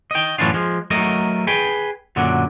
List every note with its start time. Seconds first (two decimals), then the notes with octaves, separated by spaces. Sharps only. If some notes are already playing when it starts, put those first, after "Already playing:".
0.11 D#5 G5
0.38 F#2 A2 E3 C#4 D4 F4
0.54 F3 G#3
0.91 F#3 A3 A#4 D#5
1.47 G#4 B4 G5
2.16 F#2 A#2 D3 F#3